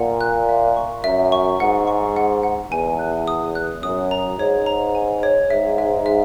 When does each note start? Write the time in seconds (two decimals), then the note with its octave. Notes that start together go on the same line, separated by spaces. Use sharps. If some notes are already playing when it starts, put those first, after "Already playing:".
Already playing: A#2 F#5
0.21 F#6
0.49 E5
0.77 C#6
1.04 F#2 E5
1.32 C#6
1.60 G#2 F#5
1.87 C#6
2.16 F#5
2.43 F#5
2.72 E2 G#5
2.99 F#6
3.28 D#6
3.55 F#6
3.83 F#2 D#6
4.11 A#5
4.39 G#2 C#5
4.66 A#5
4.95 G#5
5.23 C#5
5.50 G#2 E5
5.78 E5
6.06 E5